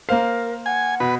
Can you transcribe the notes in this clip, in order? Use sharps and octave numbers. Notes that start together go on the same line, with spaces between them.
A#3 A#4 C5 F5
F#5 G#5
B2 B4